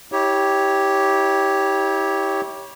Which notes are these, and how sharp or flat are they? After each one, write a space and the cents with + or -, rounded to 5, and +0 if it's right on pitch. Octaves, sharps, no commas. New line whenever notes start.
E4 -40 G4 +0 C#5 +0